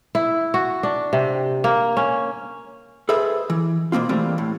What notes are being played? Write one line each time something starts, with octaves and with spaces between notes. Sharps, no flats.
E4
F#4
D4
C3
A#3
C#4
G#4 A4 B4 C5 E5
E3
B2 A#3 C4 F4
E3 G3 A3 A#3 C4 A#4
A2